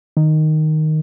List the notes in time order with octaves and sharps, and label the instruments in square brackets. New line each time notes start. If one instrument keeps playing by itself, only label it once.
[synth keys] D#3